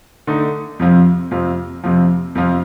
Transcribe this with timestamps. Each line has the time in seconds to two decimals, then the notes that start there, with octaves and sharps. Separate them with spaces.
0.27 D3 A3 D#4
0.79 F2 C3 F3
1.31 F2 C3 F3
1.84 F2 C3 F3
2.35 F2 C3 F3